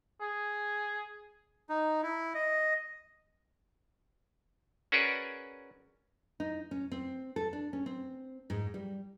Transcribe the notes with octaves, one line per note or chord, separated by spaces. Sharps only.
G#4
D#4
E4
D#5
C#4 F#4 G#4 A#4 B4 D5
D#4
C#4
C4
A4
D4
C#4
C4
G#2
G3